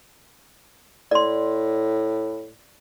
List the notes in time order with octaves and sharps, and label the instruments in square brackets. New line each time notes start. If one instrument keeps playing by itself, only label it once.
[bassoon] A2 [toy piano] D5 C6